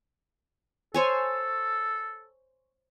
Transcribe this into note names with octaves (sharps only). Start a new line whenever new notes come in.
A4 C5 C#5 G#5